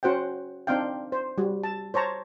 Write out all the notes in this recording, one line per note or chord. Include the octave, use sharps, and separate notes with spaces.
C#4 F#4 C5 F#5 G5
C4 D4 D#4 F5 G5
C5
G3 F#4
A5
C5 C#5 A5 A#5